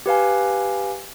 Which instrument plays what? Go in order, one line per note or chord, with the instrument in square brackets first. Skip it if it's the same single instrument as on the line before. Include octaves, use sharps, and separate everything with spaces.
[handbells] G4 B4 F5 G#5